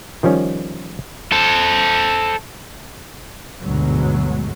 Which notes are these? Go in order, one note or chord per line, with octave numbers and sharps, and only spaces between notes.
D#3 F3 G3 C#4
A4 C5
G1 D2 G#2 B2 F#3 G#3